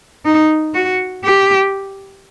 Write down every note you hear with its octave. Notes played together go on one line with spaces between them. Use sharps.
D#4
F#4
G4